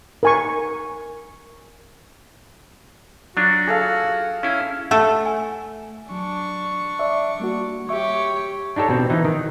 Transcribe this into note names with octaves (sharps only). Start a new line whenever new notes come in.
A#4 G#5 C#6
F#3 D4 F4 F#4
G#4 A4 F5
C#4 E4 F5
A3 A4 E5 F#5
G#5
F#3 D4 C#6
D5 E5
G3 A#3 F#4
G4 C#5 E5 C#6
D4 D#4 G4 A4 C#5
B2 C4
E3 D#4
D#3